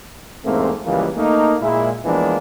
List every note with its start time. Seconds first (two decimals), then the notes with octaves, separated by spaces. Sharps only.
0.44 E2 G#2 A3 A#3 C4
0.85 C#2 E3 F3 G3 A#3
1.17 A3 A#3 D#4
1.62 A#2 G#3 E4
2.05 E3 F3 G#3 A#3 B3 D4